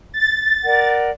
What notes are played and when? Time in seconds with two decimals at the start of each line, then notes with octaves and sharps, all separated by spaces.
0.14 A6
0.64 A#4 D5 F#5